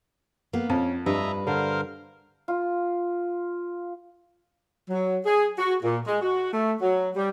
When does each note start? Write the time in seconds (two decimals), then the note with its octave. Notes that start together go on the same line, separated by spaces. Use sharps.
0.53 A#3 B3
0.70 F2 C#4
1.06 G2 B4 D#5 E5 A#5
1.47 D3 A#4 C5 F5
2.48 F4
4.90 F#3
5.25 G#4
5.58 F#4
5.83 A#2
6.07 G#3
6.21 F#4
6.53 A3
6.81 F#3
7.16 G3